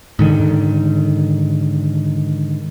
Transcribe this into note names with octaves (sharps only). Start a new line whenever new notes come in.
G#2 D3 D#3